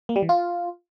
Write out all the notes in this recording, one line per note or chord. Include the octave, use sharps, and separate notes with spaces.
A#3
G3
E3
F4